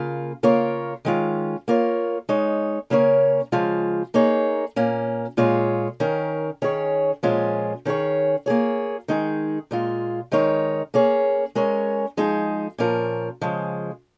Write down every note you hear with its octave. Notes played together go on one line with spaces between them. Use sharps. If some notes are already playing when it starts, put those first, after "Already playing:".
Already playing: C#3 A#3 F4
C#3 A#3 F4 A#4 C#5
D#3 G#3 C#4 F4
A#3 F4 A#4 C#5
G#3 D#4 C#5
C#3 A#3 C#4 A#4 C#5
C#3 F3 G#3 F4
A#3 D#4 G#4 C#5
A#2 A#3 C#4
A#2 G#3 F4 G#4 C#5
D#3 C#4 A#4
D#3 C#4 G#4 C#5
A#2 F3 G#3 C#4 F4
D#3 C#4 G#4 C#5
A#3 F4 G#4 C#5
D#3 G#3 D#4 G#4
A#2 G#3 F4
D#3 G#3 D#4 A#4 C#5
A#3 C#4 G#4 C#5
G#3 C#4 A#4 C#5
F3 G#3 D#4 G#4
A#2 F3 C#4 A#4
C#3 F3 G#3